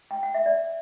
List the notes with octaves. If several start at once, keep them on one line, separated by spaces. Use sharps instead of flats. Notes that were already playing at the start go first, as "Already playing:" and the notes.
G5
F#5
E5
D5